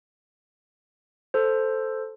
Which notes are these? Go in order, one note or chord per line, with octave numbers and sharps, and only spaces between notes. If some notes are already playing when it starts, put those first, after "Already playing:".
A4 C5